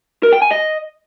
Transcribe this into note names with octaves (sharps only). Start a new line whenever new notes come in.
A#4
G5
G#5
D#5